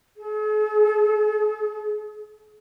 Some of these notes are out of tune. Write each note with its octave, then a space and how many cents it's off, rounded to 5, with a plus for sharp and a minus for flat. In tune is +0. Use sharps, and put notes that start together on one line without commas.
G#4 +45